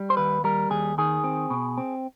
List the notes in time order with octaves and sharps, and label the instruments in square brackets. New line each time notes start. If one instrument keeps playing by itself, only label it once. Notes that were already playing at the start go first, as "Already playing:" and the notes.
Already playing: [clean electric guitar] G3
C5
D#2 B4
G3 A#4
D#2 G#4
D#3 G#4
C4
B2
C4